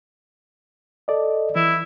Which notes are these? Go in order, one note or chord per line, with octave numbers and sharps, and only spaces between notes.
A4 D5 D#5
E3 E4